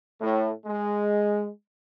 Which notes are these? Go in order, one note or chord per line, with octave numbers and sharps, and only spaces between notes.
A2
G#3